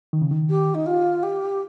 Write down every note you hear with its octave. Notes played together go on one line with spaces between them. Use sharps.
D#3
C#3
D#3
G4
D#4
F4
G4